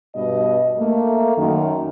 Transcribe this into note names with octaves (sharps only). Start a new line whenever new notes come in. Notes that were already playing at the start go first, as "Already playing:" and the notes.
G2 B2 D#5
A3 A#3
F#2 D#3